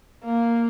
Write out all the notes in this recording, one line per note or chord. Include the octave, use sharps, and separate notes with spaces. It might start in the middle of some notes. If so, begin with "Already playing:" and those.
A#3